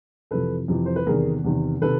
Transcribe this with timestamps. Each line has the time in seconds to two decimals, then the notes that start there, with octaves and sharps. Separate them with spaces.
0.31 F2 C3 E3 A4 B4
0.68 F2 C3 E3
0.86 C5
0.96 B4
1.06 E2 C3 D#3 G#4 A#4
1.44 E2 C3 D#3
1.81 C3 D#3 A4 B4